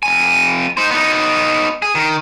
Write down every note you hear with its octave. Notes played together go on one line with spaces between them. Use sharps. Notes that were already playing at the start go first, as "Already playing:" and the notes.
F2 G#5
D#4 C5
B3 D#4
G#4
D#3